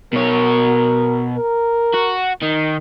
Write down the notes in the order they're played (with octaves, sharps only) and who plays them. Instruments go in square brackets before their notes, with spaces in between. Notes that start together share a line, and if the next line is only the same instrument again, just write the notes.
[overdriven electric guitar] B2 C#5 [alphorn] A#4
[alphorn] A#4
[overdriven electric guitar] F#4
[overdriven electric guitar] D#3 [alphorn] D#4